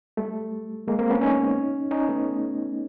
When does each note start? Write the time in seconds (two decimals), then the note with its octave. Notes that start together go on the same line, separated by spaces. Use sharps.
0.17 G3 A3
0.88 G#3 A#3
0.99 A#3 C4
1.10 B3 C#4
1.21 C#4 D#4
1.91 C#4 D#4
2.08 A3 B3